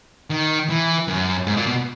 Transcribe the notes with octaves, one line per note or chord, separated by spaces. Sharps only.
D#3
E3
F#2
G#2
A#2
B2